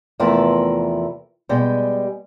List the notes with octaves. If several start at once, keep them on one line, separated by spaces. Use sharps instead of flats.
E2 C3 F3 A3 A#4 B4
B2 G3 G#3 G4